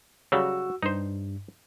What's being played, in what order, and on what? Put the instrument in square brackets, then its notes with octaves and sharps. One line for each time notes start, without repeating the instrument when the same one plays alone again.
[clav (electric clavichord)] C#3 F#3 G3 [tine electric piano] F#4 E6
[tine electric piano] G2 [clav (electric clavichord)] D#4 C5